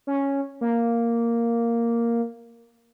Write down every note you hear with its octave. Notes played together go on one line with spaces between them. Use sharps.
C#4
A#3